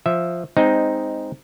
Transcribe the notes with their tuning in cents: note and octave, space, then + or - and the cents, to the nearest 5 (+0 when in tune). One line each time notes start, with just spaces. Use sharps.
F3 +0 E5 +0
G#3 -10 C4 +0 D#4 +0